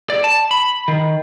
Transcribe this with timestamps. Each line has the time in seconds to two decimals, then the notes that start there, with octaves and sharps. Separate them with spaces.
0.10 D5
0.24 A5
0.51 B5
0.88 D#3